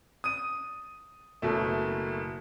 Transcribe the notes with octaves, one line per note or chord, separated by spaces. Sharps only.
D#6 D#7
F#1 B2 A3